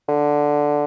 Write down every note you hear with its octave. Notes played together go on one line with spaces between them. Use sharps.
D3